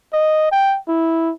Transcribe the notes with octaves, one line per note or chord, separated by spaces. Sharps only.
D#5
G5
E4